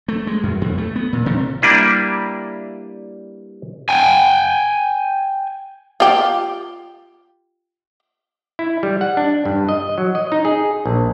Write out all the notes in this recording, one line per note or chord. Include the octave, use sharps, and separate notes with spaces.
A3
G#3
F#2
F2
A3
B3
A#2
C3
G3 A#3 D4 E4 B4
G5 G#5
F4 G4
E4
G3
F#5
D4
G2
D#5
F#3
D#5
D#4
G#4
A#1